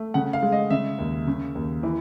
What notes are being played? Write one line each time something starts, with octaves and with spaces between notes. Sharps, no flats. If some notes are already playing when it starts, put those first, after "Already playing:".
Already playing: A3
C#3 F#5
F5
G#3
D#5
C#3 E5
D#2
C#3
D#2
E3